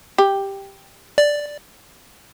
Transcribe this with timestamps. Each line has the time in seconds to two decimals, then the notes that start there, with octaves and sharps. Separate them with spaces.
0.18 G4
1.18 D5